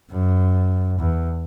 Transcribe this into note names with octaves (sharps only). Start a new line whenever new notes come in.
F#2
E2